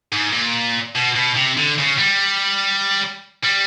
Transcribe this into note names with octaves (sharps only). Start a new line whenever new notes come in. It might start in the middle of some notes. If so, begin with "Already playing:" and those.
G#2
A#2
B2
B2
C3
D3
C#3
G3
G3